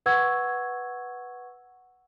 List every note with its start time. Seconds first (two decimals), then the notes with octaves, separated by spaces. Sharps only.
0.06 B4 F#5 C#6 E6 G#6